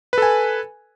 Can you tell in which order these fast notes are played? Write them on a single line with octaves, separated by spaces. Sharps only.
B4 A4 G#5